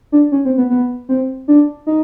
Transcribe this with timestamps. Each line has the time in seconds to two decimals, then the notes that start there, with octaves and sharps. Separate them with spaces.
0.12 D4
0.32 C#4
0.45 C4
0.58 B3
0.70 B3
1.09 C4
1.48 D4
1.87 D#4